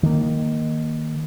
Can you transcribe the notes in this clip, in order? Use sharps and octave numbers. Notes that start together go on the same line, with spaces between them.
D#3 A#3